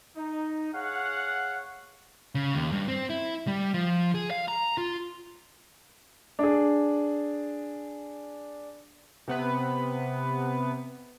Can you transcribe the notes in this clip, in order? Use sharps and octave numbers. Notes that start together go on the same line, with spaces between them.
D#4
G#4 C#5 F5 F#5
C#3
D#2
G2
C4
E4
G3
F3
G#4
F5
A#5
F4
D4 G#4
C3 B3 B4